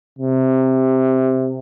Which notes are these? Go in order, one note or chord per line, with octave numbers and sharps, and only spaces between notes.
C3